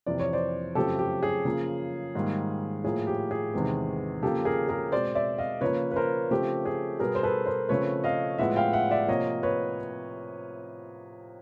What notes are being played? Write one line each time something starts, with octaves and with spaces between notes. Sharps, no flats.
F2 C3 E3 D5
C#5
C5 D5
F#2 C#3 F3 A3 C4 G4 A4
G4
G#4
C#3 F3 A#3
G#2 D#3 G3 A#3
A2 F3 A#3 G#4
G4
G#4
E2 C3 D#3 G#3 B3
C#3 F3 A#3 G4 A4
G#4 A#4
G#4 A#4
B2 G#3 C4 C5 D5
D5 E5
D#5 F5
C#3 F3 A#3 B4 C#5
B4
A#4 C5
C#3 F3 A3 C4 G4
G#4
B2 G3 B3 G#4 A#4
C5
A4 B4
A#4 C5
C#3 F3 A3 C4 B4 C#5
D#5 F5
A2 F3 G#3 B3 E5 F#5
F5 G5
E5 F#5
D5 E5
C3 F3 A#3 C#5 D#5
B4 C#5